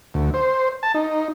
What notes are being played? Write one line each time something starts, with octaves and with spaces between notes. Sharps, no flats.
D2
C5
A5
D#4